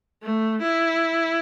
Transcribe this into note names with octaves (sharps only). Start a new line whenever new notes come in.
A3
E4